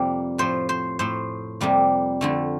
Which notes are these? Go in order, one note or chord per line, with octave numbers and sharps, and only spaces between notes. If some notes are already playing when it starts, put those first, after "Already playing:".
Already playing: F2 C3 G3 A#3
A2 F3 A3 C5
C5
A2 A3 C5
F2 C3 G3 A#3
F2 D3 A3